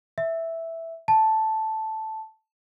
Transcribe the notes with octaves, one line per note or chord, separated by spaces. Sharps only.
E5
A5